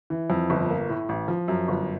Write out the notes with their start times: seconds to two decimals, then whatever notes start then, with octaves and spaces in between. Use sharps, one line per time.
0.10 E3
0.30 F2
0.50 G1
0.69 A#3
0.89 A2
1.09 A1
1.28 F3
1.48 F#2
1.68 G1